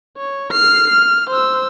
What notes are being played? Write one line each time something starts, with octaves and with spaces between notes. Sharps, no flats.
C#5
F6 C7
F6
C5 E6